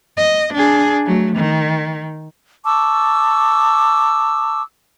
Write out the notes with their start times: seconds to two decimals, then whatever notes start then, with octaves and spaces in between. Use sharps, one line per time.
0.17 D#5
0.53 D4 G#4
1.05 F#3 A3
1.36 D#3
2.64 A5 C#6 D6 E6